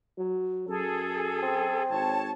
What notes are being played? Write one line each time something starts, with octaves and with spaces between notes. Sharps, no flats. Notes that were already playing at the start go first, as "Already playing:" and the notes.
F#3
F#2 G#4 A4
C4
G#1 C#5 A5